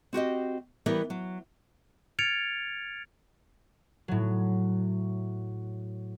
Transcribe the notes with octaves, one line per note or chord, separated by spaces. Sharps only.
C4 F#4 G4 D#5
E3 G3 B3 G4 A#4
F#3
F6 G#6 A6 C#7 D7 F7
A2 F#3